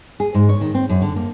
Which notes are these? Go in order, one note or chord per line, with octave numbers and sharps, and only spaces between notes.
G#4
G#2
C#5
D#3
C4
F#2
D3
A#3